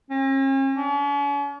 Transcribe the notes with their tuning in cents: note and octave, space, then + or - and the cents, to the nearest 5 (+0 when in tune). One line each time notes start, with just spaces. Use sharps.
C#4 -45
C#4 +45